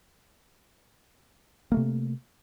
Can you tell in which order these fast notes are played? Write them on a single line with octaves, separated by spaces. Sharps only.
A#3 A3 C3